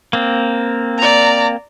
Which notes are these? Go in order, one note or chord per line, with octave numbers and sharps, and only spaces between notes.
A#3 C4
D5 A#5